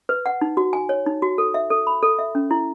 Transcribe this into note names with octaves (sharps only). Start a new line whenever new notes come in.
B4
F#5
D#4
F#4
G#5
C#5
D#4
F#4
A4
E5
A4
B5
A4
E5
C#4
E4